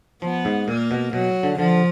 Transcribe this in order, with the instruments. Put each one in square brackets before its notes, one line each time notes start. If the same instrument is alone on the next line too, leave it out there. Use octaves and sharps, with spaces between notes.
[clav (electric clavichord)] F3 [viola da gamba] B3
[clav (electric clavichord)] G#2
[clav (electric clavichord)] A#2 [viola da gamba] A#3
[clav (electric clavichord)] B2
[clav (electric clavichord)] B2 [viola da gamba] F#3
[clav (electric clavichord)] D3
[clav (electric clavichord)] D3 [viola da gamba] F3